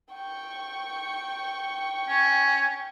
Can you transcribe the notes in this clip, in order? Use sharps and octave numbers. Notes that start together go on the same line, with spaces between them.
G5 C#6
C#4